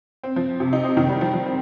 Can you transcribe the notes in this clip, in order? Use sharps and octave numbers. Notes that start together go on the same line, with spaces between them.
C4
F3
C3
D#4
C4
D#3
G3
F3
F3
C4